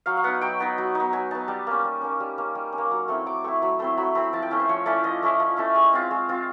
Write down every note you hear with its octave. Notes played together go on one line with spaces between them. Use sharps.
F#3 F5
F5
B3 D#4 F#5
F#3 G5
B3 D#4
F#3
B3 D#4
F#3 G#5
B3 D#4 A5
G3 A5
A#3 C#4
G3
A#3 C#4
G3
A#3 C#4
G3
C#4
A#3
F#3 A#5
A3 C4 E4 C#6
F#3 D6
A3 C4 E4 C#6
F#3 B5
A3 C4 E4 C6
F#3 B5
A3 C4 E4 B5
F3 A5
G5
A3 C#4 E4
C5
F3 C#5
A3 C#4 E4 D5
F3 D#5
A3 C#4 E4
F3
A3 C#4 E4
G#3
C4 F4
G#3
C4 F4